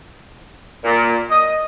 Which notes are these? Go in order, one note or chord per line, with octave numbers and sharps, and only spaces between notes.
A#2
D#5